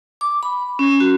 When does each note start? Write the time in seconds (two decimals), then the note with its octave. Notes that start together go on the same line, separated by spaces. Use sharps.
0.21 D6
0.43 B5
0.79 C#4
1.00 F#4